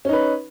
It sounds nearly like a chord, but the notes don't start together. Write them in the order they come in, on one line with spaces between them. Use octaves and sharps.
C#4 D#4 B4